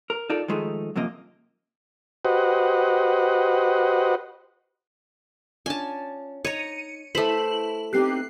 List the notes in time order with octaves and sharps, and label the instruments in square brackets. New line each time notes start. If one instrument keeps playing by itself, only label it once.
[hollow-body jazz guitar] A#4
D#4 F4 A4 A#4 D5
D#3 F3 G#3 A3 C#4 D#4
F#2 C3 F3 A#3 D#5
[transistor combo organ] F#4 G4 B4 C5 D#5 F#5
[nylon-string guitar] C#4 D4 F4 [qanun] G#5 A5
[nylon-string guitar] D#4 [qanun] C#5 A#5 [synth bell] C#7 D#7
[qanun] A3 C5 [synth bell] E4 F#7 [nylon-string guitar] B4
[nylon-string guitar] B3 C4 D#4 [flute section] G4 [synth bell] F#6 C7